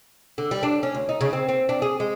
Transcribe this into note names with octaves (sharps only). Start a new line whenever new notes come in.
D3
G3
D4
C#4
D2
D#4
C#3
C4
C4
D4
G#4
G#3